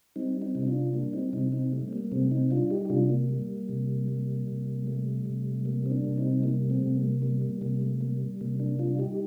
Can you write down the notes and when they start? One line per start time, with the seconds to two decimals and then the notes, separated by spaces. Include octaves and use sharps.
0.16 G3 C4 D#4
0.42 C4 D#4
0.55 C3
0.62 D#4
0.67 D4 F4
0.93 G3 A#3 D4
1.13 C4 D#4
1.33 C3 C4 D#4
1.52 C4 D#4
1.73 G3 A3
1.88 C4
1.93 A#3
2.11 C3 A3 C4
2.31 C4 D#4
2.51 G3 D4 F4
2.70 D#4 G4
2.85 G4
2.90 C3 D4 F4
3.09 A#3
3.29 G3
3.69 C3
4.08 G3
4.48 C3
4.87 G3 A3
5.25 C3
5.65 G3 A#3
5.86 C4
5.91 A#3 D4
6.05 C3
6.17 C4 D#4
6.43 G3 A#3
6.70 A3 C4
6.83 C3
6.96 A#3
7.22 G3 A#3
7.42 A#3
7.61 C3 A#3
7.81 A3
8.01 G3 A#3
8.41 C3 A#3
8.59 A#3 D4
8.79 G3 D4 F4
8.99 D#4 G4